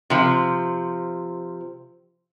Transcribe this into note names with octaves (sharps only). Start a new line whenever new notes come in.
C3 F3